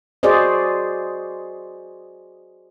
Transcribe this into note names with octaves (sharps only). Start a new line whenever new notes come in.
F#4 G#4 C5 D5 D#5